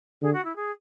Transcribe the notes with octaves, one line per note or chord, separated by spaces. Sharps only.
D3 G#4
F#4
E4
G#4